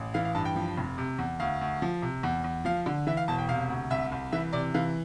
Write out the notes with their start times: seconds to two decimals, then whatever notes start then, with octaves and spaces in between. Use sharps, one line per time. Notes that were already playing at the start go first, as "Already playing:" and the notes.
Already playing: A1
0.14 E3 F5
0.25 F5
0.35 G2 A5
0.45 G5
0.56 F3
0.78 F1
0.98 C3
1.19 E2
1.40 D2 F5
1.61 D2
1.82 F3
2.02 C3
2.23 E2
2.44 E2
2.65 F3 F5
2.86 D3
3.07 E3 E5
3.17 F5
3.28 E1 A5
3.39 G5
3.48 C3 F5
3.69 D2
3.90 C2 E5
4.12 C2
4.32 E3 E5
4.53 C3 D5
4.74 E3 F5